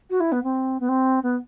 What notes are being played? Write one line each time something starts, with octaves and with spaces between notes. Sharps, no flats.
F#4
E4
B3
C4
B3
C4
B3